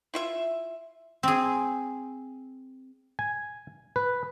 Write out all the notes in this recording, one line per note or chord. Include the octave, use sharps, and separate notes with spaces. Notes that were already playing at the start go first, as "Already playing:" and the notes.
E4 F4 E5
C4 G#4
G#5
B4